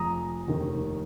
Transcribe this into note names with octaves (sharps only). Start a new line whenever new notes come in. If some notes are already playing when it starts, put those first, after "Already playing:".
Already playing: F1 F2 F3 G#3 A#5 D#6
F1 D#2 D#3